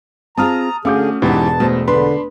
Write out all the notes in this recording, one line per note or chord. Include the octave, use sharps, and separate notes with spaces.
C4 F4 G#4 A5 A#5 D#6 F6
D3 A3 C#4 F#4 G#4 F5 D6 G6
E1 G#2 E3 B3 G4 A5
B2 A3 C5
D3 D4 B4 B5 C6